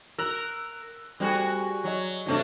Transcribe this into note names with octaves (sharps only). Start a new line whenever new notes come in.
A#4 E6 F#6 F#7
G3 A3 C4 F#4 G#4
F#3 F#4 D#5
C3 F#3 A3 C4 D4 D#4